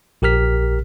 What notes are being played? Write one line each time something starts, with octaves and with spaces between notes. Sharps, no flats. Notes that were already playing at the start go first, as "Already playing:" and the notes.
A#1 G4 A#4 F6 B6